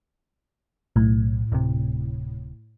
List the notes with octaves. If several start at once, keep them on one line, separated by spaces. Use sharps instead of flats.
B1 A2
D1 C3